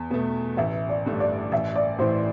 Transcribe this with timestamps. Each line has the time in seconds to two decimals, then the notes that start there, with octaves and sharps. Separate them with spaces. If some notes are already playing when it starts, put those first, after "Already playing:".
Already playing: E2
0.10 B2 A3 B4
0.57 A1 E5
0.89 D5
1.06 G2 D3 A3 D4
1.20 D5
1.52 A1 E5
1.76 D5
1.99 A2 E3 C5